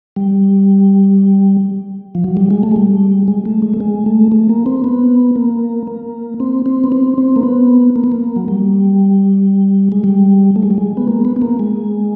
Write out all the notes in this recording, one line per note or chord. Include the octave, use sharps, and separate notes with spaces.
G3
F3
F#3
G3
G#3
A3
G#3
G3
G#3
A3
G#3
A3
G#3
A3
A3
A#3
C4
B3
A#3
A#3
C4
C4
B3
C4
C4
A#3
B3
A#3
B3
A#3
F#3
G3
G#3
G3
A3
G#3
G3
G#3
B3
A#3
B3
B3
A#3
G#3